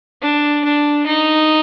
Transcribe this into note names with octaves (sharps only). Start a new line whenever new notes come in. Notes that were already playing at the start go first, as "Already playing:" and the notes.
D4
D4
D#4